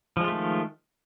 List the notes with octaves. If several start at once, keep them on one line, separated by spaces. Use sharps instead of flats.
D#3 F3 G#3 A3 F4